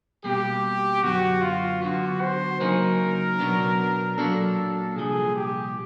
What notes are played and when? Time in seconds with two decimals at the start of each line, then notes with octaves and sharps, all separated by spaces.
0.24 B2 G3 A#3 G4
1.03 F#2 D3 F#3 B3 F#4
1.42 F4
1.81 D3 F#3 B3 F#4
2.21 C5
2.61 C#3 F#3 A#3 D#4 G#4 A#4
3.39 B2 F#3 B3 D4
4.17 A#2 F#3 A#3 D4 A4
4.96 C2 A#2 F3 G#4
5.36 G4